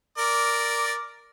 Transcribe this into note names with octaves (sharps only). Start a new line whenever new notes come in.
A#4 D5